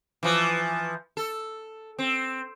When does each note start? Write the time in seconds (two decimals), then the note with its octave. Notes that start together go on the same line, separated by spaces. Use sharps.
0.23 E3 F3
1.17 A4
1.99 C4